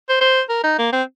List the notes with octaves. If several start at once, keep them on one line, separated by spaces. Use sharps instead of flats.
C5
C5
A#4
D#4
A#3
C4